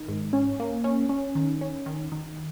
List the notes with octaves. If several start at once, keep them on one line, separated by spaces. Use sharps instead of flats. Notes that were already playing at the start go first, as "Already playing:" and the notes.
Already playing: D#3
G#2
C#4
A#3
C#4
C#4
D#3
C#4
D#3
D#3